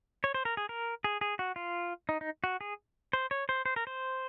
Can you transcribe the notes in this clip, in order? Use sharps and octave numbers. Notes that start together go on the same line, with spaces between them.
C#5
C5
A#4
G#4
A#4
G#4
G#4
F#4
F4
D#4
D#4
F#4
G#4
C5
C#5
C5
C5
A#4
C5